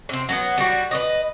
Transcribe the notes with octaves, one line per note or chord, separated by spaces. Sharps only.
C3 C4
F#3 A#3 B3
G3 F#4
B4 D5 D#5